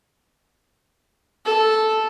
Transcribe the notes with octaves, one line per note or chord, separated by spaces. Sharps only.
A4